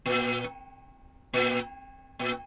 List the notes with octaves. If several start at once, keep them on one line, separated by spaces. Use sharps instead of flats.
A#2
A#2
A#2